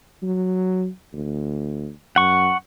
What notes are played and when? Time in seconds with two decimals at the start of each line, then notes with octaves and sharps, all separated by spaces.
0.22 F#3
1.13 D2
2.16 F#2 F#5 C#6